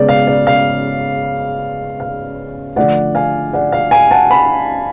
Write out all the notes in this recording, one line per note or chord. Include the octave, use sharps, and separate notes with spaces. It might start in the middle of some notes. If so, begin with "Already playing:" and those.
Already playing: C#3 G#3 B3 D5
F5
D5
F5
F5
D3 F3 A3 D5 F#5
F5 G#5
D5 F#5
F5
F5 G#5
F#5 A5
G#5 B5